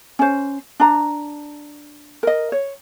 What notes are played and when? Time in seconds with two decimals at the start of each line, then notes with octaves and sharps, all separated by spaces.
0.19 C#4 C5
0.80 D4 A#5
2.23 A#4 D#5
2.52 C#5